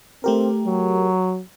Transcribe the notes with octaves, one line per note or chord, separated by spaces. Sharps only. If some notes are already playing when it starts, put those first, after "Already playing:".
A3 C4 G4 A#4
F#3